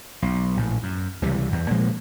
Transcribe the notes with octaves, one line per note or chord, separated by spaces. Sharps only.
B1
A#1 A2
F#2
C#2 C3 E3 G3
E2
A#2 F3 G#3 A#3